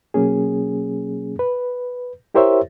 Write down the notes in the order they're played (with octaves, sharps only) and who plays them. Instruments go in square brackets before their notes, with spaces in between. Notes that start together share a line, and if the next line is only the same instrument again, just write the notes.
[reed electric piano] B2 F#3 A#3 C#4 G#4
B4
E4 G4 A#4 C5 C#5 E5